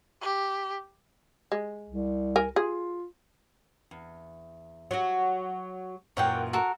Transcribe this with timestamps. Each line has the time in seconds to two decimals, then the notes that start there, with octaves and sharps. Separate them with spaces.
0.22 G4
1.52 G#3
1.90 C2
2.36 A#4 G#5
2.56 F4 G#4
3.91 E2
4.91 F#3 F#4
6.17 F#2 A#2 E3 C#5 F#5 G5
6.53 F#4 A4 A#4